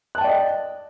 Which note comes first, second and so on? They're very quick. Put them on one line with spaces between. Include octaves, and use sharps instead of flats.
F#6 A5 G5 D5 D#5